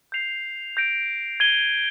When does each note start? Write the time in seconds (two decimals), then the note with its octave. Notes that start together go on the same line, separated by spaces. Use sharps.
0.12 G6 C7 F7
0.77 G6 A#6 D7
1.40 G#6 D#7 G7